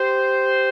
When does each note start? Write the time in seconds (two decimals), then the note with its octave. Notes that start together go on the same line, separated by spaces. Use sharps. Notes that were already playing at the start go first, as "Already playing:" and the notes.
Already playing: G4 C5